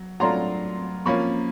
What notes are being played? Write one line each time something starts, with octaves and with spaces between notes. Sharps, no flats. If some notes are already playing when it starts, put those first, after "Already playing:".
Already playing: F#3
F#3 A3 D4 F4 A#5 C6
F3 A#3 C#4 B5 C#6